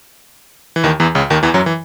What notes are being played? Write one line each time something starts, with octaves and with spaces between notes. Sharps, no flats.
E3
D#2 D#3
E2 E3
C#2 C#3
D#2 D#3
E2 E3
F#2 F#3
E3